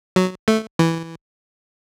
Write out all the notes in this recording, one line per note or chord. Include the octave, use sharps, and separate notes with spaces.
F#3
A3
E3